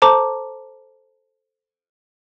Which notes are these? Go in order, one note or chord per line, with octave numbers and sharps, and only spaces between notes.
A4 C5 A5 A#5 D6